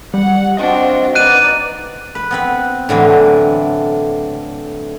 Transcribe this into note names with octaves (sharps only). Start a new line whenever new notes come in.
G3 F#5
C4 D4 F4 F#4 D#5 F#5
D#4 B4 D5 F#6 D#7
B4
B3 C4 B4
A2 D3 E3 F#3